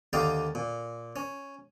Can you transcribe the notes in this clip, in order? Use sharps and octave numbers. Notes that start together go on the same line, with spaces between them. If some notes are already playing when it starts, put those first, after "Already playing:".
D#2 D3 D#4 D5 F5 G5
A#2
C#4